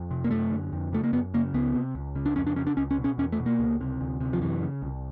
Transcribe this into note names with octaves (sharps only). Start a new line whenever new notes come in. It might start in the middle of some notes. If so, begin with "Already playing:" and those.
Already playing: F2
C3
A#3
F#2 A3
D3
F2
C#3 A3
A#3
F#2 B3
C#3 A#3
C#2 B3
C3
C#2
C#3
D4
F2 C#4
D4
C#3 C#4
D4
C#2 C#4
C#4
B2
C#4
E2 C#4
A3
B2
A#3
C#2
C3
D2
C3
F3
F#2 E3
C#3
C2